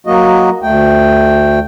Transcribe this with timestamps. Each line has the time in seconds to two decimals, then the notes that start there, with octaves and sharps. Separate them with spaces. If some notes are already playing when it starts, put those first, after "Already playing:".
0.07 F#3 A#3 F#4 D#5
0.62 D2 A3 G5